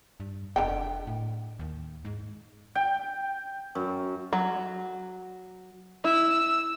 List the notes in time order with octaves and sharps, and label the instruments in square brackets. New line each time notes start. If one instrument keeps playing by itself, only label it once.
[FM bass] G2
[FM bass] F1 [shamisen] D3 D#3 G5
[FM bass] A2
D#2
G#2
[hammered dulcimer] G5
F#2
[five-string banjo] F#3
[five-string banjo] E4 [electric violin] E6